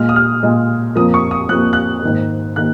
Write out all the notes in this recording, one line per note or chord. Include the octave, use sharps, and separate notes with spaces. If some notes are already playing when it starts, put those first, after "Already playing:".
Already playing: A#2 G#3 F6
D#6
F6
A#2 G#3
F2 F3 A#3 D#6
C#6
D#6
F2 F3 A#3 F#6
F#6
G#2 D#3 A#3
D#3 A#3 F#6